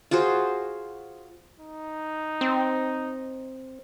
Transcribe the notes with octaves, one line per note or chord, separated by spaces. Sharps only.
F4 F#4 G#4 C5
D#4
C4